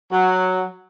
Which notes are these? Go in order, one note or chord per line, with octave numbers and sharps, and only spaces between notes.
F#3